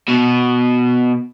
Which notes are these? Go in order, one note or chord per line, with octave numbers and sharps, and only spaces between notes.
B2